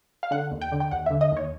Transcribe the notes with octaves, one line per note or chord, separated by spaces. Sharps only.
F5
D3 F#5
D#2
G5
D3
G5
D#2 F#5
E5
D3
D#5
D#2 C#5